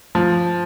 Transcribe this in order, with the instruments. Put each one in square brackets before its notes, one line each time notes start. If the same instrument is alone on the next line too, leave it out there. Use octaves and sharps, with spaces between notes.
[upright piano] F3